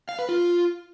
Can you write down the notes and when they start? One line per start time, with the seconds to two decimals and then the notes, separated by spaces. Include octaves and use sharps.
0.09 F5
0.19 B4
0.29 F4